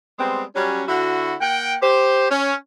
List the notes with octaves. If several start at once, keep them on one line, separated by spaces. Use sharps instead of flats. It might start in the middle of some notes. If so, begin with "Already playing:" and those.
G3 G#3 B3 C4
F#3 G3 C#4
D3 E4 F#4
A#3 F#5 G5
G4 C5
C#4